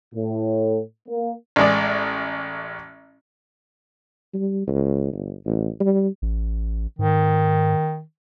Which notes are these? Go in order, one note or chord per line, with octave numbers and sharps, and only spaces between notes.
A2
A#3
A1 G#3 D5
G3
C#2
G1
A1
G3
A1
G#2 D#3